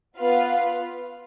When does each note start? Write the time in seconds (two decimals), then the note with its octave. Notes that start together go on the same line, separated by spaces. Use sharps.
0.17 B3 F4 B4 F5